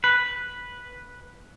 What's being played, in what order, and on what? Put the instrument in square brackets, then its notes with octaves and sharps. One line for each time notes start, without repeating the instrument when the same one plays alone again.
[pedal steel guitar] B4